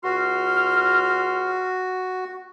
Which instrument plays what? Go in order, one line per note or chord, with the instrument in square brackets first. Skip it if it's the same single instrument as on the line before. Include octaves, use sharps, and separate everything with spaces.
[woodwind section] C#2 C6 F6 [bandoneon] F#4